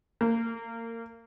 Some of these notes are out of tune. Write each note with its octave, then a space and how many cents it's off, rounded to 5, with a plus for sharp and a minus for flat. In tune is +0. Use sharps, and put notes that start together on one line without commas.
A#3 -25